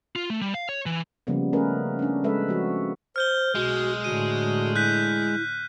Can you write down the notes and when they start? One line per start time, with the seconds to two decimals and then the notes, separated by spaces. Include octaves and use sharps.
0.16 F4
0.30 A3
0.41 G3
0.54 F5
0.69 C#5
0.86 E3
1.27 C#3 F3 G3 A#3 B3
1.53 A3 C#4 G#4 A#4 B4 D#5
1.99 C#4 D4
2.24 G#3 A4 B4 E5
2.49 F3 C4 F#4
3.16 C5 F6 G6 G7
3.55 B1 G#3 F#4
4.04 A2 D3 F#4 D#7
4.76 E4 F#6 G6 B6